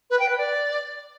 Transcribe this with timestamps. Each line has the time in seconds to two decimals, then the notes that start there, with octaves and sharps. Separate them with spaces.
0.10 B4
0.19 G5
0.28 B4
0.38 D5